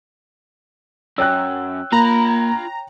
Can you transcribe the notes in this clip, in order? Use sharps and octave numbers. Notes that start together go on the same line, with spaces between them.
F#2 C#5 G5 E6 F#6
A#3 F4 A#5 B5